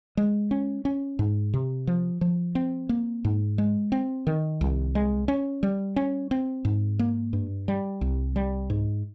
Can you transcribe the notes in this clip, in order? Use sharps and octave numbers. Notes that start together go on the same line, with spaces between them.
G#3
C#4
C#4
G#2
C3
F3
F3
C4
A#3
G#2
G#3
C4
D#3
C2
G#3
C#4
G3
C#4
C4
G#2
A#3
G2
G3
C2
G3
G#2